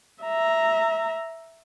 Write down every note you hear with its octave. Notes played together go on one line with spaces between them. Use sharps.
E5 A#5